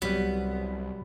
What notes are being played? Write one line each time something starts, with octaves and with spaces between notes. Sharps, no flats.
C2 F#3 G3 B3